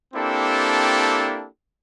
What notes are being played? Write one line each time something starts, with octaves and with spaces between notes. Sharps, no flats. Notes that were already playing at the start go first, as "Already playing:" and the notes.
A#3 C4 D4 E4 G4 A4